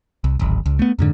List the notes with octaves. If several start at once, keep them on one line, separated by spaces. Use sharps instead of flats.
C2
D1 G#1
C#2
A3 B3
F2 G#2 D3